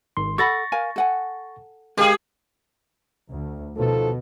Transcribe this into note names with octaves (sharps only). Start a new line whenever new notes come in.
G#1 D#3 C6
A4 F#5 B5 C#6 A6 A#6
A#4 F5 G#5
A4 F#5 G#5
G#3 G4 G#4 A#4 F5
D2
B2 F3 D#4 A4